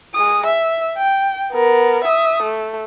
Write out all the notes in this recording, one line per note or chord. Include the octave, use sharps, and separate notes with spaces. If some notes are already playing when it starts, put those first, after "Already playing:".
G#3 D#6
E5
G5
B3 A#4
E5 D#6
A3